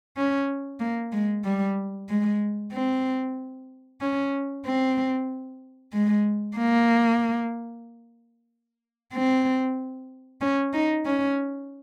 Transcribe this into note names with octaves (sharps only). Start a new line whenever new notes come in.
C#4
A#3
G#3
G3
G#3
C4
C#4
C4
G#3
A#3
C4
C#4
D#4
C#4